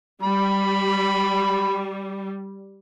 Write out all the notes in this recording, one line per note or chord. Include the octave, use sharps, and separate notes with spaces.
G3 B5